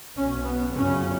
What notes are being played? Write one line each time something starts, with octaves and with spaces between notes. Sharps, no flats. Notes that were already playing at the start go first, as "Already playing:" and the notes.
B1 B2 C#4
B3
G1 F#2 C#3 C#4